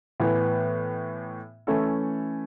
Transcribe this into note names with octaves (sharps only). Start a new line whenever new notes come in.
A2 E3 B3
E3 A3 C#4 E4 A4